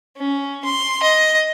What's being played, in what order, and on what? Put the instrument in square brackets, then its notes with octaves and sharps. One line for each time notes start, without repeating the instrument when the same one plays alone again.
[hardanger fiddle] C#4
C6
D#5